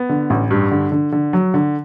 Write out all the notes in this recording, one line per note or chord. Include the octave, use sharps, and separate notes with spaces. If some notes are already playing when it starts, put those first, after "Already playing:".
Already playing: B3
D3
A1
G2
D3
D3
D3
F#3
D3